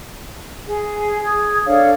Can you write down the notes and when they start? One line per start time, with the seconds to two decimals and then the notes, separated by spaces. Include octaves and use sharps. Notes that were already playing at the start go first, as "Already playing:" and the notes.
0.66 G#4
1.24 G#4 D#6 G#6
1.65 D4 A4 C#5 F5